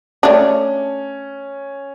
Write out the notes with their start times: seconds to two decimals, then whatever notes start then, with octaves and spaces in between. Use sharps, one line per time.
0.23 A3 C#4 D4